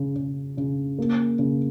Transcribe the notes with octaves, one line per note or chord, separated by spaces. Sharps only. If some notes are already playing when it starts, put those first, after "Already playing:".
Already playing: C#3
C#3
C#3
A#3
C#3